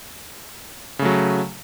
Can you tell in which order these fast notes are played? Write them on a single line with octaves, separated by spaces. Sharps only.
C#3 A3 F#3